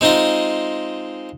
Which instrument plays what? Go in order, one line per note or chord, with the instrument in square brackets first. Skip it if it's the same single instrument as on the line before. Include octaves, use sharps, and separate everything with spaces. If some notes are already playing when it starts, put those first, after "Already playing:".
[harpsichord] G#3 C4 D#4 F4 D#5